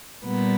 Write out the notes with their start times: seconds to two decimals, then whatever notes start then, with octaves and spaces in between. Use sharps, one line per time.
0.24 A#2 G3 B3